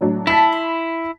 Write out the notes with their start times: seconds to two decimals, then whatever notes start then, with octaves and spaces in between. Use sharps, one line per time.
0.01 A2 F#3 D4
0.27 E4 A5 B5 B6
0.52 C6